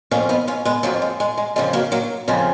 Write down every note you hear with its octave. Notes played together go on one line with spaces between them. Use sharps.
F2 F3 A#3 C#4
B3 D#4
C#4 F4
G#3 B3
F2 F3 F#3 A#3
G#3
G#3
G#3
F2 C#3 F3 G#3
F#3 A#3
F#3 A#3
F2 C#3 F3 G#3 B3